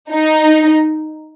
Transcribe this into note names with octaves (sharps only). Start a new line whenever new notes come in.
D#4